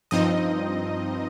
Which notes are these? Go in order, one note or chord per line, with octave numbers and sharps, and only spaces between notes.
G2 F3 C4 D#4 D#5